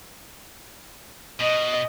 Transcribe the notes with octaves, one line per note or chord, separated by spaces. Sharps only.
B2 D#5